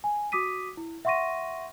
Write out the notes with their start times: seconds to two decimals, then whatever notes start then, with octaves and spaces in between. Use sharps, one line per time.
0.04 G#5
0.32 F#4 D6 D#6 B6 D#7
0.77 E4
1.05 E5 F#5 C6 C#6 A#6 D#7